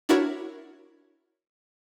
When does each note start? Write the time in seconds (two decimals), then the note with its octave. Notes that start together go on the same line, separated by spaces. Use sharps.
0.09 D4 E4 F#4 A#4 C#5